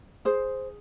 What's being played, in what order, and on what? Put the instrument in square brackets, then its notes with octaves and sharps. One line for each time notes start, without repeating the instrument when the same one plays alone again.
[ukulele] G#4 C5